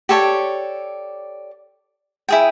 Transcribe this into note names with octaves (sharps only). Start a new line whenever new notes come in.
G4 A4 C#5 D5
E4 G#4 G5